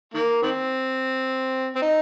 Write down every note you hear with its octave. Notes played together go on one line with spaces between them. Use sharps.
D#3 A#3
D#3 C4
C4
D#4